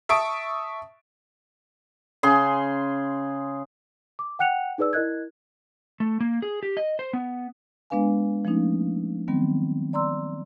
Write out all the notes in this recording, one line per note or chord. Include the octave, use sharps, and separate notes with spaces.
E5 A5 C#6 D#6 D7
C#3 G#4 C6
D6
F#5 G5 F#6 C#7 F7
D#4 G#4 B4 D5 E6
E4 A#4 D#5 F#6 G#6
A3
A#3
G#4
G4
D#5
C5
B3
G#3 B3 D4 B4 F5 G#5
F3 A3 A#3 C#4 D#4
D#3 F#3 G3 B3 C4
D5 A#5 C6 E6